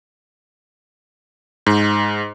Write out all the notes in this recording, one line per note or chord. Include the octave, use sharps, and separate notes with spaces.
G#2